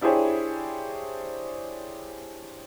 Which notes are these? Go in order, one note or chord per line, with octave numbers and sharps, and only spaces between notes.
D4 E4 G4 G#4 C5 C#5